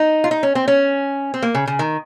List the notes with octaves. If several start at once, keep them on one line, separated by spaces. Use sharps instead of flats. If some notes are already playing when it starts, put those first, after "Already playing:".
Already playing: D#4
F4
D#4
C#4
C4
C#4
C4
A#3
C#3
C#3
D#3